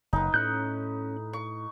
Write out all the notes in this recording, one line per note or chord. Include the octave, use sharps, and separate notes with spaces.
F#1 D#4 B4
A2 C#4 F#6 G6
C#6